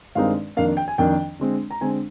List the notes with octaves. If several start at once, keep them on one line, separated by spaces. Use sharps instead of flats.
G2 D#3 G#3 C4 D#4 F5
F2 D#3 A#3 D4 F5
G5
G#5
F2 D#3 A#3 D4 G5
D3 G#3 C4
A#5
D3 G#3 C4 G#5